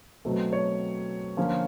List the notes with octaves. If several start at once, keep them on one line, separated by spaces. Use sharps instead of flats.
B2 F#3 A3 C4
C#5
D3 F3 A#3 C#4